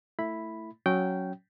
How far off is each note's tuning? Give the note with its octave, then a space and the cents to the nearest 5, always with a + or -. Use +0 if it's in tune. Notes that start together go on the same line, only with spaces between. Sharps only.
A3 +15 E4 +0 B5 +0
F#3 +0 C#4 +0 G5 -15